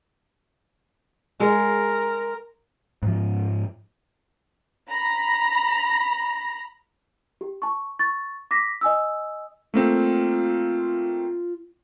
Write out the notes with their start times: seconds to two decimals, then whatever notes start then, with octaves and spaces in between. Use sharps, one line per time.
1.40 G#3 A#4
3.03 G#2 F3
4.90 A#5 B5 A#6
7.41 G4
7.62 A5 C#6
7.99 C#6 A6
8.51 D6 A#6 B6
8.81 D#5 G#5 D#6 E6
9.74 A3 A#3 C4 F4